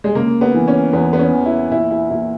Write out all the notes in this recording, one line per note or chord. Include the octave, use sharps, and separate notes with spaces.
G#3
C#3 A#3
B3
E3
C#4
E2 B3
B3
C#4
E2
E4
A#2 E4
E4
A#2 E4